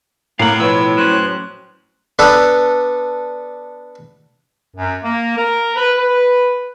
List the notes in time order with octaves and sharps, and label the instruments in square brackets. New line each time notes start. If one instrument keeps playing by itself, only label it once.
[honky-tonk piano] A2 [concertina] A#3 [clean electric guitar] F5 F#5
[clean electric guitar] B2 F3 [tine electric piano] E4 B4 C#5 [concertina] E6
[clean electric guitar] F#3 C#4 [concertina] C5 F#6
[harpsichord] B3 D4 A4 B4
[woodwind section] F#2
A#3
A#4
B4
B4